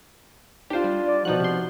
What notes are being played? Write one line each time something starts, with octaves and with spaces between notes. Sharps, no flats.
D4 F4 G4 C5
G3
D5
B2 F3 D#4 F#4 F#6
C3 C6